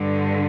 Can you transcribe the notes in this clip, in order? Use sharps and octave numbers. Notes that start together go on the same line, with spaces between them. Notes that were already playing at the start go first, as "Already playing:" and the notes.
Already playing: G2 D3